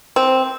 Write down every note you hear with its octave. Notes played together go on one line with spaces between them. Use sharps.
C4